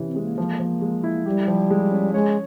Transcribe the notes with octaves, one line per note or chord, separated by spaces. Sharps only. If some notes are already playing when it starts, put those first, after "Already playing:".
Already playing: C3 E3 C#4
C4
G#3
A#3
F3
F3
G#3
E4
G3 G4
F3
G#3
C#4
G#3 C#5